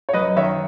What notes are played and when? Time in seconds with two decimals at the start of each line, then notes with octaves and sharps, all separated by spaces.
0.09 C#5
0.13 F#2 B4 D#5
0.36 D#3 C#5 E5